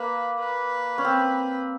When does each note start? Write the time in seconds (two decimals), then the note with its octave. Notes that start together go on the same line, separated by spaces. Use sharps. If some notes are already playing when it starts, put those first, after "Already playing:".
Already playing: A#3 B4
0.40 B4
0.98 C#4
1.05 C4